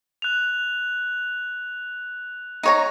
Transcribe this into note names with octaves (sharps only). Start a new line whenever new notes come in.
F#6 F7
D#4 C#5 A#5